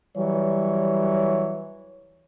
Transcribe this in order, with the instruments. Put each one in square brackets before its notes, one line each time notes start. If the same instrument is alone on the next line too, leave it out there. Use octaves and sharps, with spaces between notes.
[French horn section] E3 F#3 G3 C#5